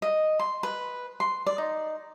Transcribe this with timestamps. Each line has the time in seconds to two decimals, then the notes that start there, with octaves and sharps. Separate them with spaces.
0.02 D#5
0.39 C6
0.63 B4
1.20 C6
1.46 D5
1.58 D#4